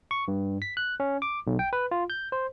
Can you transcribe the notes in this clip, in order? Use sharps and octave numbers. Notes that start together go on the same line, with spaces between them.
C#6
G2
B6
F#6
C#4
D6
B1
G5
B4
F4
G6
C5